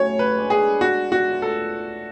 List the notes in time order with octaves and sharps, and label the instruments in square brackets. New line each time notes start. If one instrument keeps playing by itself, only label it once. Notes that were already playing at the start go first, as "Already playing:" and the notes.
Already playing: [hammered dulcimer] A2 C#3 F#3 C#4 [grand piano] C#5
[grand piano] B4
[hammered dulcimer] G#3 D4
[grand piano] G#4
[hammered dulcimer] B2 [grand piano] F#4
[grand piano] F#4
[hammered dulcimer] A3 F4
[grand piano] A4